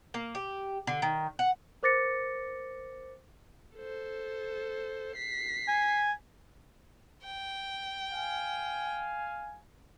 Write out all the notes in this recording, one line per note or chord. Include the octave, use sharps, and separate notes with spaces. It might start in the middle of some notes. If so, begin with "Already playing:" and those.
A#3
G4
D3
D#3
F#5
A#4 C5 D6 A6 A#6 C#7
A4 C5
B6 C7
G#5
G5
F5 G#5